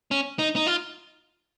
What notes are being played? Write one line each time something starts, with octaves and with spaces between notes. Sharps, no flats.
C#4
D#4
D#4
F4